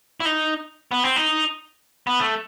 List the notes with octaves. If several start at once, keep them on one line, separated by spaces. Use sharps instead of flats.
E4
D#4
B3
C4
D#4
B3
A3